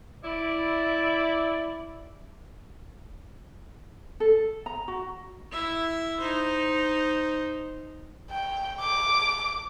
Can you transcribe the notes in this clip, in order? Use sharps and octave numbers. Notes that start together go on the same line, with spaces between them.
E4 D5
A4
A#5
F#4
E4 E5
D#4 C5
G5
D6